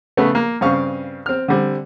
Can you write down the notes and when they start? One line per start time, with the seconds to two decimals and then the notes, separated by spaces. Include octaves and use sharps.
0.17 C#3 A3 B3
0.35 A#3
0.61 G2 C#3 C4 F5 C#6
1.26 C4 F6
1.48 D3 G3 C4